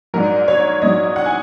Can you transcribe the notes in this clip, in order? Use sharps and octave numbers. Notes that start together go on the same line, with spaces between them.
A#1 G#2 F#3 A#4
C#5
A#1 G#2 F#3 D#5
F#5
G#5